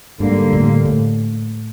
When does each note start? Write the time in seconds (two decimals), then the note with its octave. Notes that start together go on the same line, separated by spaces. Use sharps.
0.19 G#2 D3 G3 A#3
0.53 A2
0.85 A2